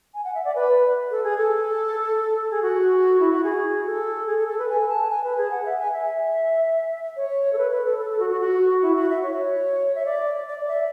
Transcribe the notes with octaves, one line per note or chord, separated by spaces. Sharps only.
G#5
F#5
E5
D5
B4
A4
G#4
A4
G#4
F#4
E4
F#4
G#4
A4
G#4
A4
A4
B4
G#5
A5
G#5
B4
G#4
F#5
E5
G#5
E5
C#5
A4
B4
B4
A4
A4
A4
F#4
F#4
F#4
E4
F#4
E5
C#5
E5
D5
D5
E5